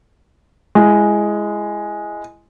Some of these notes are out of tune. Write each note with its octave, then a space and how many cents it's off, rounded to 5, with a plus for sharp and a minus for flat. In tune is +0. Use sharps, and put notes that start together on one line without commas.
G#3 +0 E4 +25